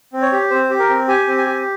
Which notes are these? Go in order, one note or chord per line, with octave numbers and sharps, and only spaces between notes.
C4
C#5
G4
C4 C5
G4
A#4
C4
G4 G#5
C4
G#5
G4